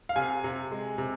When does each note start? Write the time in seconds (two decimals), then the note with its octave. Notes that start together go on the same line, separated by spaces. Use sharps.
0.09 F5
0.16 C3 G#5
0.44 C3
0.71 G#3
0.98 C3